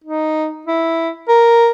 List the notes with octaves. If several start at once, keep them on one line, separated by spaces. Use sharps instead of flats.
D#4
E4
A#4